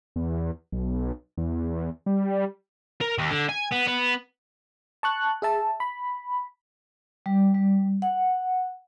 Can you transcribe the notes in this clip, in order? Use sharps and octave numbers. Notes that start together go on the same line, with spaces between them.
E2
B1
E2
G3
A#4
D#2
D3
G#5
B3
B3
A5 C#6 F#6
G#4 E5 A5
B5
G3
G3
F#5